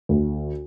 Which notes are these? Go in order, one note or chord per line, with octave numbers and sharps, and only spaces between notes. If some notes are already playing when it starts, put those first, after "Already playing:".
D2